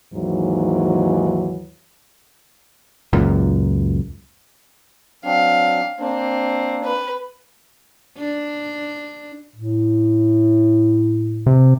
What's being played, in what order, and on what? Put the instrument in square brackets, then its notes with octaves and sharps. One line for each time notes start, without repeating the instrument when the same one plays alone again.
[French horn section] D#2 G#2 E3 F#3
[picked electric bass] C#2 F#2 A#2
[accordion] F#3 C4 D4 [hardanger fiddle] F5
[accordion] A#3 D4 [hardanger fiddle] C4
[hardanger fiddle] B4
[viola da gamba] D4
[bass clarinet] A2
[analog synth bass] C3